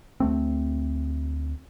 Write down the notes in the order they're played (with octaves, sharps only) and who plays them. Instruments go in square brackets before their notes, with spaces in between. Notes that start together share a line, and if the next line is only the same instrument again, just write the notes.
[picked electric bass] D2 A3 C4